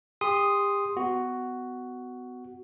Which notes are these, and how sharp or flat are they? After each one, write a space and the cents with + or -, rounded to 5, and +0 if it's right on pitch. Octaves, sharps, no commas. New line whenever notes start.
G4 +35 C6 +0 D#6 +0
B3 +25 F#4 +5